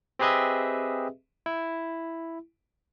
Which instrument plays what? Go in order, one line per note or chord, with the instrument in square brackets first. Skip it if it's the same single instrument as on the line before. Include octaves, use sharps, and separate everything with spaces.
[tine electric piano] C4 G4 G#4 B4 D#5 E5
E4